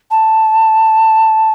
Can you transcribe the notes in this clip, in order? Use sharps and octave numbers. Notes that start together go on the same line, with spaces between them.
A5